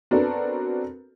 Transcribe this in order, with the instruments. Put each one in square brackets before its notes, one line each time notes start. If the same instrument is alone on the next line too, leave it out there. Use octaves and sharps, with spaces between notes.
[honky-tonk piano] B3 C4 D4 F#4 A4 A#4